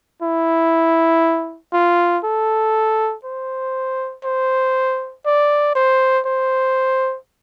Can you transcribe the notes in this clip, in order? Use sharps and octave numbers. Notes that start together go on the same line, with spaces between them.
E4
F4
A4
C5
C5
D5
C5
C5